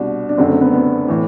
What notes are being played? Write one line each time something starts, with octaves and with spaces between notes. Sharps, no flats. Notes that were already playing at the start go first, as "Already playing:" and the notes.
Already playing: C2 B2 D4
D4
F#1 F#2 D3 C4
A3
B3
B3
A2 E3